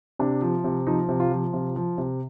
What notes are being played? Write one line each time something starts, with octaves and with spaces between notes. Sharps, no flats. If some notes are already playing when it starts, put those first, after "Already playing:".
C3 D4
F3
C3
F3 D#4
C3
F4
F3
C3 F4
F3
C3